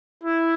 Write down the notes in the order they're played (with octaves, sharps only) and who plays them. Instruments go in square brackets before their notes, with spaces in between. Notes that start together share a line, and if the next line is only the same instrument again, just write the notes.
[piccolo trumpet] E4